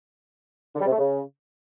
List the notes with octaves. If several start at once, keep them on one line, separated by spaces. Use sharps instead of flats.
D3
G3
C3
A3
C#3